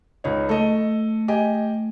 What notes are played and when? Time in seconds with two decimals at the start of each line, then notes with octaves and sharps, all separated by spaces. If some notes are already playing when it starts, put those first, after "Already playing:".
0.24 C#2 D#4 C#5
0.49 A3 A4 D#5
1.28 G4 D#5 G#5